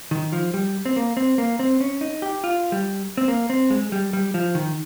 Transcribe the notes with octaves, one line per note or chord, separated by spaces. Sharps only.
D#3
F3
G3
C4
A#3
C4
A#3
C4
C#4
D#4
G4
F4
G3
C4
A#3
C4
G#3
G3
G3
F3
D#3